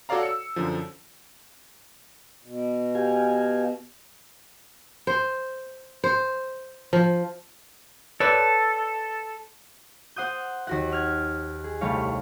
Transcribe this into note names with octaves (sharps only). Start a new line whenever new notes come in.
F#4 A4 C#5 D5 F5 A#5
E6 C#7
F#2 D3 F3
B2
G4 F5 G#5
C5
C5
F3
A4 B4 C#5 D5
C5 F#5 D#6 G6
D#2 F#4 F#5
F6 G#6
G#4
C2 G3 A3 C#5 F5